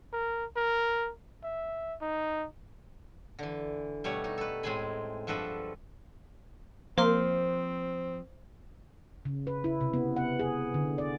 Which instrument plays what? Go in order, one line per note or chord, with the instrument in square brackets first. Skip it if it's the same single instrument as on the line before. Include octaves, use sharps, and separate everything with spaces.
[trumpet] A#4
A#4
E5
D#4
[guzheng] D3 E3
B2 G3 A3 C#5
D#4
A4 B4
A2 G#3 C4 G#4 G#5 B5
G2 F3 F#4 A4 B4 E5
[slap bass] F3 [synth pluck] A#3 [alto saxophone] C4 [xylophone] C5 C6 F6
[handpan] C#3
B4
E4
C3
B3
F#5
G#4
D3
D5